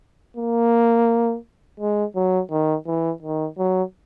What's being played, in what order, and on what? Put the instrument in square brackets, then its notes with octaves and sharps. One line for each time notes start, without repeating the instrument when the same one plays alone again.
[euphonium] A#3
G#3
F#3
D#3
E3
D#3
F#3